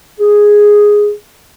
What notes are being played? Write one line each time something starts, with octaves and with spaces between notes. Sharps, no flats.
G#4